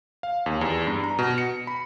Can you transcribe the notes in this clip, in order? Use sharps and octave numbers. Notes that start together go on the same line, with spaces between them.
F5
D#2
E2
G2
A#5
B2
C#7
B5